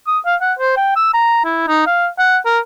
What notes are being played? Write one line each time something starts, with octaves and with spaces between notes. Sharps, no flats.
D#6
F5
F#5
C5
G5
E6
A#5
E4
D#4
F5
F#5
A#4